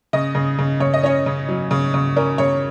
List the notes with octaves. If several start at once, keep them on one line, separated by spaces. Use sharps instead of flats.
C#3 D#5
C#3
C#3
C#3 C#5
D#5
C#4 C#5
C#3
F#3
C#3
C#3
C#4 A#4
C#3 C#5